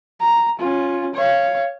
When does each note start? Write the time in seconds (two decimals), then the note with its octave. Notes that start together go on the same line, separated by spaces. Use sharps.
0.20 A#5
0.59 C#4 F4
1.14 C#5 F5